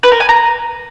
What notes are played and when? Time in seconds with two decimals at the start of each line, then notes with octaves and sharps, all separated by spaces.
0.03 B4
0.12 A#4
0.20 G#5
0.29 A#5